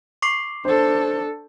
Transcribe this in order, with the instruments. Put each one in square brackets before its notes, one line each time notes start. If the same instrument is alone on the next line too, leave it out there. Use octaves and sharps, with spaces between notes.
[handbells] C#6 D6 C7
[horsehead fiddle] D4 A4 [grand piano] C5